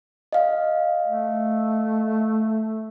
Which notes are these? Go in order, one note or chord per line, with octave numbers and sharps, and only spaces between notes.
D#5 F5
A3